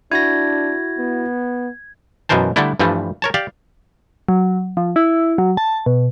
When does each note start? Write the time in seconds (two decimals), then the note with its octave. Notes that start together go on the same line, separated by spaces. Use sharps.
0.12 D4 E4 F#4 G#6 A#6
0.98 B3
2.29 F#2 B2 E3 A#4 C5 A5
2.56 D3 G3 A3 D4 E4
2.80 G2 E3 F3 G3 A3
3.22 A#4 C#5 A5
3.34 G4 D5 F5
4.29 F#3
4.77 F3
4.96 E4
5.38 F#3
5.57 A5
5.86 B2